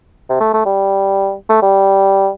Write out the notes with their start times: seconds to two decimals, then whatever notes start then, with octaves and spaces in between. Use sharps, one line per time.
0.29 C3
0.41 A3
0.53 A3
0.65 G3
1.49 A3
1.62 G3